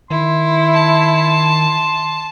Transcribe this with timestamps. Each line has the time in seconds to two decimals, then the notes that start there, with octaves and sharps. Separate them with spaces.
0.10 D#3 E4 C6
0.74 A5